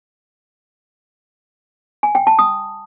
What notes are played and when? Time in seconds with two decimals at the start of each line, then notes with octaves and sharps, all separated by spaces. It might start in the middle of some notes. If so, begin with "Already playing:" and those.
2.03 G#5
2.15 G5
2.27 A5
2.39 D#6